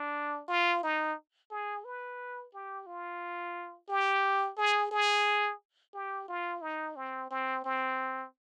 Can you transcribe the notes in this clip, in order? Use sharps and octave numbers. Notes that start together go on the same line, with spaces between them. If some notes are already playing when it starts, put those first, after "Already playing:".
Already playing: D4
F4
D#4
G#4
B4
G4
F4
G4
G#4
G#4
G4
F4
D#4
C4
C4
C4